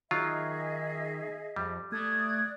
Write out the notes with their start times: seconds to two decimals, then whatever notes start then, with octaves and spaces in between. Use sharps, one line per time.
0.11 D#3 F#3 F4 G#4 D#5 E5
1.56 F2 G3
1.92 A3 D5 D#6 F#6 G#6